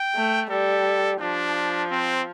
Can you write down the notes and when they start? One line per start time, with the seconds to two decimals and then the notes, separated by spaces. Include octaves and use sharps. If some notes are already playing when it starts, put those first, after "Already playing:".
Already playing: G5
0.15 A3
0.50 G3 A4
1.21 F3 D4
1.91 C4